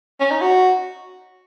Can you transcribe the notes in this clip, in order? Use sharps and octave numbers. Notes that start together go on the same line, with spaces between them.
C#4
D#4
F#4